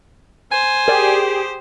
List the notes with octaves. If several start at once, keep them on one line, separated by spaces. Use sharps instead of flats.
C5 G#5
G4 G#4 A#4 D5 G5